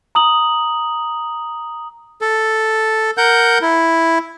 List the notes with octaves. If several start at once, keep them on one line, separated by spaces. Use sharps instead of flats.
A#5 D#6 F#7
A4
A#4 F#5 G6
E4